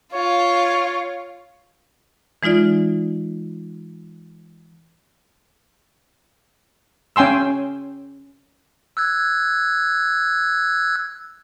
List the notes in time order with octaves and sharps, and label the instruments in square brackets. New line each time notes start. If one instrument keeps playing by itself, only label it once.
[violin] F4 [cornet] C#5
[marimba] E3 G#3 D#4 F4 D5
[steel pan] C#4 G5 G#5 C6 E6
[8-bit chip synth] E6 F#6 G#6